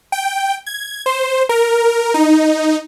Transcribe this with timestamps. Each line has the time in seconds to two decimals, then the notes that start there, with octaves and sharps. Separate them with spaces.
0.12 G5
0.66 G#6
1.06 C5
1.49 A#4
2.14 D#4